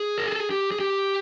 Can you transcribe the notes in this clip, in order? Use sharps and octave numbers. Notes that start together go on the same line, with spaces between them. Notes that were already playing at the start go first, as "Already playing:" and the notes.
Already playing: G#4
A#4
A4
G#4
G4
G#4
G4